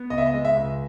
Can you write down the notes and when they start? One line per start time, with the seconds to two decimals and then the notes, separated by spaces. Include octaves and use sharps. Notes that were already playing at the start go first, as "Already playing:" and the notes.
Already playing: B3
0.10 C#2 D#5
0.18 E5
0.26 D#5
0.33 G#3
0.45 E5
0.57 C#2